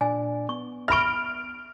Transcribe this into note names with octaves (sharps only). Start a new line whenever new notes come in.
A#2 D4 D5 G#5
B3 C#6
E5 B5 C#6 F6 D7